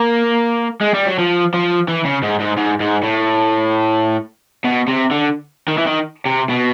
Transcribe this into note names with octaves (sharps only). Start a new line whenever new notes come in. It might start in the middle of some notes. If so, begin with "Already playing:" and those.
Already playing: A#3
G#3
G3
F#3
F3
F3
E3
C#3
G#2
G#2
G#2
G#2
A2
B2
C3
D3
D#3
E3
D#3
C3
B2